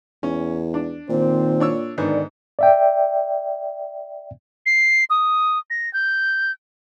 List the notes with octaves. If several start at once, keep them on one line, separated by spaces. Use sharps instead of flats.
E2 C#4
D4
A#2 D#3 C4 C5
D4 C#5 E6
G#2 D3 D#3 B3 D5
D5 E5 G5
C7
D#6
A#6
G6